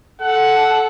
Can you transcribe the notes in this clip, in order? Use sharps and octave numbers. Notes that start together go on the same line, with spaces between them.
A4 F#5